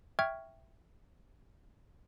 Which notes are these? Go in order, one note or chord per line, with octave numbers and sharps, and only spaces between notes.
E5 G5 C#6 F6 G#6